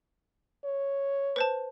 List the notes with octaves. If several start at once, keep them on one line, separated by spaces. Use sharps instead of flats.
C#5
B4 C5 A5